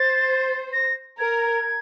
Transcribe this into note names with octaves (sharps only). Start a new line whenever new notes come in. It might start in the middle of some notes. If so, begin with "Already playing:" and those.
Already playing: C5 A6
A#6
A#4 G#6